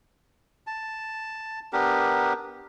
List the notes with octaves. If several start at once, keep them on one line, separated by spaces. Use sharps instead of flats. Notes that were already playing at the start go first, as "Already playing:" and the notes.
A5
B3 D4 G4 A#4